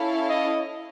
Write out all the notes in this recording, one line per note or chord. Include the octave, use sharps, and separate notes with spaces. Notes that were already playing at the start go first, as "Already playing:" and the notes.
Already playing: C#4 E4 A4 C#5 F5
D#5